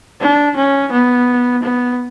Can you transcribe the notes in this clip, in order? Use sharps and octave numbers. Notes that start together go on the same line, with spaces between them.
D4
C#4
B3
B3